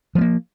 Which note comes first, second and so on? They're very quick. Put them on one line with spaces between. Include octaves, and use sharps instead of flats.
F3 A3 A#3